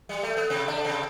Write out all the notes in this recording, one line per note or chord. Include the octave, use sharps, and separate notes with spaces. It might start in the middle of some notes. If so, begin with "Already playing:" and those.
G3
A3
B3
C3 C4
D3 D4
C3 C4